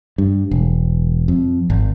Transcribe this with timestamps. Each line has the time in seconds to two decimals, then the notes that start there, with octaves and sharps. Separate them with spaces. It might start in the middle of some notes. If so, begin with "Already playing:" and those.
0.18 G2
0.51 E1
1.28 F2
1.70 G#1